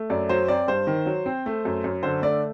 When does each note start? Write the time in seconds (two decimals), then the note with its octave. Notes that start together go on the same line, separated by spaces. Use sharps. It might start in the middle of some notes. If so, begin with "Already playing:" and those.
Already playing: A3
0.10 F#2 D5
0.29 F#3 C5
0.48 C4 D5
0.68 G2 C5
0.87 D#3
1.06 F#3
1.26 C4
1.46 A3
1.65 F#2
1.84 F#2
2.03 D3 C5
2.22 A3 D5